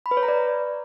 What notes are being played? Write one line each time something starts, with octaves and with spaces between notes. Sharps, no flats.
B5
B4
C#5
A#5
D5